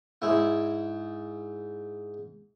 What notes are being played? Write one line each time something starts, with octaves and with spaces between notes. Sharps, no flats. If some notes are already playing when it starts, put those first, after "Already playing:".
G#2 E4